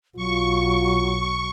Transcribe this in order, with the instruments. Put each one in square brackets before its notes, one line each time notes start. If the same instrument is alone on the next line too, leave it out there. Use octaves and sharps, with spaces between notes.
[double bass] B1 [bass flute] F#3 [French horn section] F4 [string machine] C#6